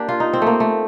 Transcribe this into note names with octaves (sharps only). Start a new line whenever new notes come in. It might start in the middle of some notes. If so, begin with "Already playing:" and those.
Already playing: A#3 D4 G4
F4
D#4
C4
A3 A#3
A3